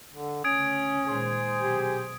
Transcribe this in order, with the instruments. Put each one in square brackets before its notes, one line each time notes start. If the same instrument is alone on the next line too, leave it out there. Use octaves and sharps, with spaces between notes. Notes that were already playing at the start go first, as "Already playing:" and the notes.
[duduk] D3
[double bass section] D2 C#3 [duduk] C#4 [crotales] D#6 G#6 D7
[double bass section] A#2 D#3 G#3 [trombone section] G#4 C5
[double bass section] B1 [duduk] G4